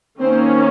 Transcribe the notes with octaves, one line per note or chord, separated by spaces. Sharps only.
D#3 A#3 C4 C#4 C5